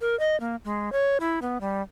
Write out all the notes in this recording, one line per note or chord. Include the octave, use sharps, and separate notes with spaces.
A#4
D#5
A#3
G#3
C#5
E4
B3
G3